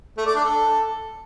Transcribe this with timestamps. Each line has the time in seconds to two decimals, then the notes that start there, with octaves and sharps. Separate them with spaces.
0.18 A3
0.26 D5
0.35 D4
0.44 A4